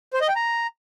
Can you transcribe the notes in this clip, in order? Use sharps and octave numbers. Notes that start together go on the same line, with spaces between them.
C5
D#5
G5
A#5